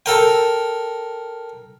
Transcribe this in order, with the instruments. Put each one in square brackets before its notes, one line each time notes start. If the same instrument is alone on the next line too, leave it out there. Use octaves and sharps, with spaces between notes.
[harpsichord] A4 A#4 G5